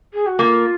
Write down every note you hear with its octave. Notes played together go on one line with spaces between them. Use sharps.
G#4
F#4
A#3 F4